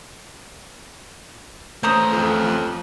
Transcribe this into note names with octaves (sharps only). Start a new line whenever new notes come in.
A3 C#4 C5 A#5 D#6
F2